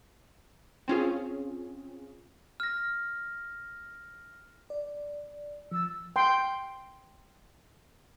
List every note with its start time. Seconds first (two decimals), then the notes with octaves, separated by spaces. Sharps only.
0.88 C4 C#4 F4 G#4
2.60 F6 A#6
4.70 D5
5.72 F3 E6 A6
6.16 G5 C6